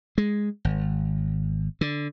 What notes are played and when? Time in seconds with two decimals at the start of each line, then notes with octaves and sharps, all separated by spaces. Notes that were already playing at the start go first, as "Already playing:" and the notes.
0.18 G#3
0.65 G#1
1.81 D3